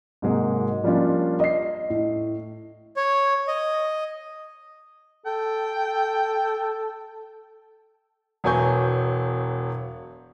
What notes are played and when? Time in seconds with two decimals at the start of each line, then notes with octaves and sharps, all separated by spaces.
0.22 G#2 C3 F#3 G#3 A#3
0.84 F3 G3 A#3 C#4 D4 F4
1.40 D#5 C7
1.90 A2
2.97 C#5
3.48 D#5
5.26 A4 G5
8.44 E1 F#3 B3 G#5 C#6 G6